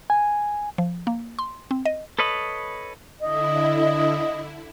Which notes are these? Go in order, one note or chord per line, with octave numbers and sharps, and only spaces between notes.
G#5
F3
A#3
C6
C4
D#5
A4 B4 C#5 D#5 B5
D3 E4 D#5